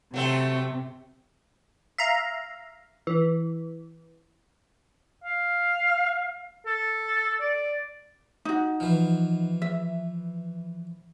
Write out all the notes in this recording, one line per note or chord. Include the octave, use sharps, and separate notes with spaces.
C3 F#3 A3 C4
E5 F5 A#5
E3
F5
A4
D5
D#4 F#4
E3 F3
E5